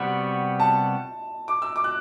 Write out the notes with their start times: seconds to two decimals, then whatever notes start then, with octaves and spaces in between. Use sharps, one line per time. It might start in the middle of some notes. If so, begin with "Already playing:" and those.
Already playing: C3 G3 B3 F#4
0.60 A5
1.48 D6
1.62 E6
1.76 D6
1.84 F#6